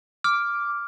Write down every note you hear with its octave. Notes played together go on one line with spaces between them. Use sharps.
D6 F6